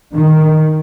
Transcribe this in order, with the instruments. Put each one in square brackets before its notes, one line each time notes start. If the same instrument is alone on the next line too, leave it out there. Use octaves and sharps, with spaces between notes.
[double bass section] D#3